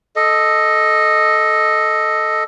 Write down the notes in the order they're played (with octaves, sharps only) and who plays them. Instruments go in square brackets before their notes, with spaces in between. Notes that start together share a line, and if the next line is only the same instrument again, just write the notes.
[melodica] A4 D#5